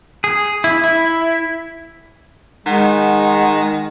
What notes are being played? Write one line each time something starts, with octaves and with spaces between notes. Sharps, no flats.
G#4
E4
E4
D#3 G#3 F#5